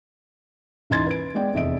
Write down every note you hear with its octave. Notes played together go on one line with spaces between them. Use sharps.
D#1 E3 D#4 C6 G#6 A6
B4 D7
G#3 B3 D5 G5
F1 E2 D#5 E5 D7